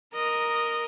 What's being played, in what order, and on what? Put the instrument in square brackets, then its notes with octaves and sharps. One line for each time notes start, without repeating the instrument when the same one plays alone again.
[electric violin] A#4 D#5